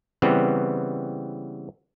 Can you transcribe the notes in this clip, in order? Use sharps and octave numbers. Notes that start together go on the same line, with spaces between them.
C#3 E3 G3 B3 C4